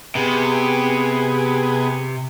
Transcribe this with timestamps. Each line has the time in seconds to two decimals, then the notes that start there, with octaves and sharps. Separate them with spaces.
0.15 C3 B3 G#4